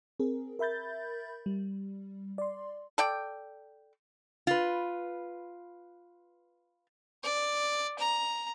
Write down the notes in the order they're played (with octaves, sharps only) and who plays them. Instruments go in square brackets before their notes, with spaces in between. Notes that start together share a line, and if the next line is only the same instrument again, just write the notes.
[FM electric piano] C4 G#4 A#4
A#4 E5 B5 G6 A6
G3
D5 C6
[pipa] A4 D5 G5
[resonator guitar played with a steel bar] F4 B4
[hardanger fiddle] D5
A#5